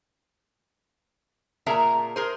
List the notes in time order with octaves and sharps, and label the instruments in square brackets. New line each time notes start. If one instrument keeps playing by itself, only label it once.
[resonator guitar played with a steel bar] A#2 G#4 A#4 E5 A5 A#5
G#4 A#4 C5